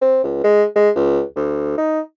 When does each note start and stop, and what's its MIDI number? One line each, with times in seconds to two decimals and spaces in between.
0.01 0.19 60
0.24 0.43 37
0.44 0.64 56
0.76 0.90 56
0.95 1.21 37
1.35 1.74 38
1.78 2.00 63